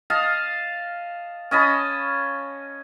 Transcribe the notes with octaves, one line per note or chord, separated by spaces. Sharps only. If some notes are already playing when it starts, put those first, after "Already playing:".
D#5 F5 A5
C#4 D#5 A5 B5